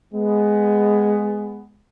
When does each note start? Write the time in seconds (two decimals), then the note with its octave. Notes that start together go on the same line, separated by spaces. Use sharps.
0.13 G#3 B3